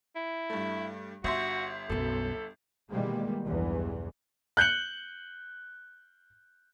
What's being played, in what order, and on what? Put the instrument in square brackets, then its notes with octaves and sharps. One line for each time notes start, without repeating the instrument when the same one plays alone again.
[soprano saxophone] E4
[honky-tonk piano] G2 A3
[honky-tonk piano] G1 E5 C6 [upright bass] D#4 [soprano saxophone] F#4
[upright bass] B1 F#2 [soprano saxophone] A4
[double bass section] B2 D#3 E3 G3 G#3 A#3
B1 E2 G2 E3
[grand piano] F#6 G6 C#7 F#7